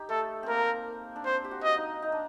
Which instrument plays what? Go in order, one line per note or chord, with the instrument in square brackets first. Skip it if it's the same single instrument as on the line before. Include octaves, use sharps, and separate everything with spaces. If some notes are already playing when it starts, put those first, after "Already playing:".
Already playing: [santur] D#4 G4
[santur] A3 [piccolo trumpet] A4
[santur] C4
[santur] A#3 [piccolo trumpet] A#4
[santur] D4
[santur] C4 [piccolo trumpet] C5
[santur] G4
F#4
[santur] F#4 [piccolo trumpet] D#5
[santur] D#4
D#4
D4